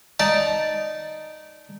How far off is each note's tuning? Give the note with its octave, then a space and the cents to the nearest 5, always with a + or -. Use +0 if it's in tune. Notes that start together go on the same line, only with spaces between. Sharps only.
D#4 -5 D5 +0 A5 -10